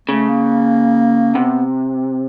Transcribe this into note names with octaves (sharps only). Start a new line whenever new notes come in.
C#3 A3
A#3
C3 B3